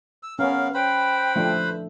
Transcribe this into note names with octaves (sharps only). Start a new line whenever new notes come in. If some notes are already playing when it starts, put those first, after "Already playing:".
E6
B3 C#4 A#4 F5
B4 C5 G5 B5
F3 A3 D4